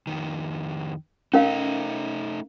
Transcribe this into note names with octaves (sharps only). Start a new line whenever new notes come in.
F2 G#2 D#3
A3 C#4 D#4 A#4 F5